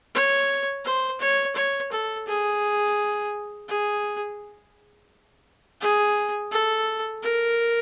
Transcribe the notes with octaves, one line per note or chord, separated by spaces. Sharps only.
C#5
C5
C#5
C#5
A4
G#4
G#4
G#4
A4
A#4